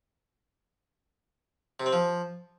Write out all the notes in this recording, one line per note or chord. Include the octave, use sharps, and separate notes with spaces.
C3
C4
F3